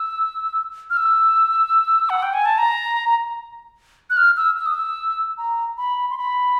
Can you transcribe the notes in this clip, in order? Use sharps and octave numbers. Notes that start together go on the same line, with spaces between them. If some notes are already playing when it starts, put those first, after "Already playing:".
Already playing: E6
F6
E6
F#5
G5
G#5
A5
A#5
F#6
F6
E6
E6
D#6
E6
A#5
B5
C6
B5